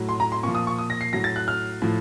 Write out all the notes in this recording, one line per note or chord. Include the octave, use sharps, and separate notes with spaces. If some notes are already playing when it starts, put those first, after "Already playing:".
Already playing: A2 F#3
C6
A#5
C6
A#2 F3 C#6
D#6
C#6
D#6
A#6
C7
A2 F#3 A#6
A6
F#6
F6
A2 F3